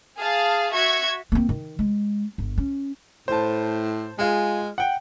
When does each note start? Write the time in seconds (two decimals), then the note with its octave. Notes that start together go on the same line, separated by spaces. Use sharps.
0.17 G#4 F5 A5
0.72 F#4 E5 C#6 G#6
1.32 A#3 C4
1.49 D#3
1.79 G#3
2.38 G1
2.58 C#4
3.28 A2 C5 A5
4.19 G#3 F4 G#4
4.78 F#5 G5